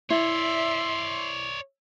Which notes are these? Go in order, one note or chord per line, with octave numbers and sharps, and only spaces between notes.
E4 C#5 D5 E5 C6